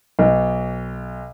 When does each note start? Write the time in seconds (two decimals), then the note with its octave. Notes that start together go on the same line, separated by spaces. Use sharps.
0.19 B1